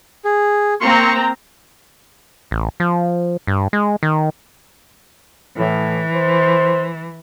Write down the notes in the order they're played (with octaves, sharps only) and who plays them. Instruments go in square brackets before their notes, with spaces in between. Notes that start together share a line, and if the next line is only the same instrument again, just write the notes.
[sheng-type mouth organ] G#4
[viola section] A#3 C4 A#5 [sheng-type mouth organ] C6 C#6
[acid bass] A1
F3
G2
G#3
D#3
[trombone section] A2 [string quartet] E3
[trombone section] C5